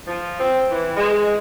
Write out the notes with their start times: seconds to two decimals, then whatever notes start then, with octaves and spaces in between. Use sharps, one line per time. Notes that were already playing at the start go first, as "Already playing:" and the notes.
0.08 F3
0.40 C4
0.70 E3
0.96 G#3